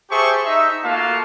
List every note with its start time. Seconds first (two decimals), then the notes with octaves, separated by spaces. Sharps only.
0.10 G4 G#4 C5 E5 A5 C#6
0.45 D#4 E5
0.84 A3 A#3 F4 F#4 F5 A5